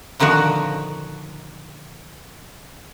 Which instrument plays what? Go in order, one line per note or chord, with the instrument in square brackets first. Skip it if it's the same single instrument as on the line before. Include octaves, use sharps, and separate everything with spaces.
[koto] A#2 D3 D#3 F3 F#4